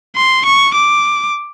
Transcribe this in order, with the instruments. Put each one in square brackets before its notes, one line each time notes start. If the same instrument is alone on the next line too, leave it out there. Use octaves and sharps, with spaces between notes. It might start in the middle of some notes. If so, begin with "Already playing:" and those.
[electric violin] C6
C#6
D6